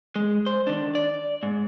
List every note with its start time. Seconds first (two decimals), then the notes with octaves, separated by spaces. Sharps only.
0.16 G#3
0.46 C5
0.67 D#3 D4
0.95 D5
1.43 G#2